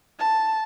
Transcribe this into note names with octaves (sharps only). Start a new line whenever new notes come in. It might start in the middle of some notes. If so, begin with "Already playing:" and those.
A5